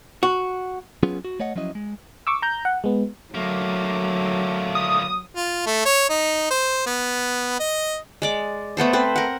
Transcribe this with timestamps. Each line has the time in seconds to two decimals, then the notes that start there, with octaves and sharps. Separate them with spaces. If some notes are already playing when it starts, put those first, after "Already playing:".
0.23 F#4
1.03 F#3 B3 C#4 F4 G#4
1.25 F#4
1.40 A3 C#5 D#5 F#5
1.55 F3 F#3 C#4 E4 D#5
1.75 G#3
2.27 C#6 D6 E6
2.42 A#5 G6
2.65 F#5
2.84 G#3 B3
3.35 D3 F#3 A3 A#3
4.75 D#6
5.35 F4
5.66 A3
5.86 C#5
6.09 D#4
6.50 C5
6.87 B3
7.59 D#5
8.22 G#3 D5 D6
8.77 A3 B3 A4 C5
8.93 C4 B4 C5
9.16 A#4 F#5